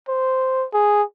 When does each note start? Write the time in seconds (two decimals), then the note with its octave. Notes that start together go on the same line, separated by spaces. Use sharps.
0.08 C5
0.74 G#4